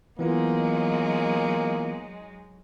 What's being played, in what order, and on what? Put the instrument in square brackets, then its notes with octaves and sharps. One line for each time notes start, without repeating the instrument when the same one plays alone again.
[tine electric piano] E3 B3 F4 [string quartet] F#3 G#3 D#4 [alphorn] A#3